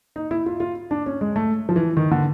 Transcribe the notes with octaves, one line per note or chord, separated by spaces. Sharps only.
D#4
E4
F4
F4
D4
C#4
G#3
A3
F3
E3
D#3
D3